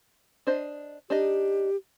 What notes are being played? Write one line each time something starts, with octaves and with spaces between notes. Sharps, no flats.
D4 C5 D#5
D4 D#4 G4 D#5